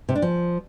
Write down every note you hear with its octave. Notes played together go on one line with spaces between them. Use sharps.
C3
D4
F3